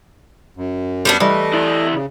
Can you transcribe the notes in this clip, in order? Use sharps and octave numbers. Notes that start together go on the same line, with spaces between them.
F#2
G3 B3 D4
E3 G3 A3 D#5
E4 D5
C#3